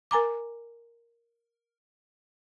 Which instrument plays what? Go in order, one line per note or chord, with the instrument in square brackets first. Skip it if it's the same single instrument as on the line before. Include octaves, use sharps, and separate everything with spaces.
[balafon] A#4 G#5 A#5 D6